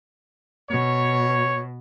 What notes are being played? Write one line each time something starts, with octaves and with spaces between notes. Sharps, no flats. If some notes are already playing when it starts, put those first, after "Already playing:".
B2 C#5